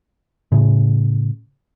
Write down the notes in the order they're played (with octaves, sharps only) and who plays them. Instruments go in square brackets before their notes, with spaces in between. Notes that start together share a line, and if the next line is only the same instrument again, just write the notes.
[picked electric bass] A2 C#3